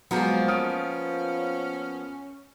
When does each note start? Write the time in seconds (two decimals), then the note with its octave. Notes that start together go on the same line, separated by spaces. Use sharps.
0.11 F3 F#3 G#3 A#3 B3
0.48 C#4 D#6 F6 D7